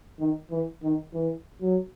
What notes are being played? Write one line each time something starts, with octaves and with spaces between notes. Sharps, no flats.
D#3
E3
D#3
E3
F#3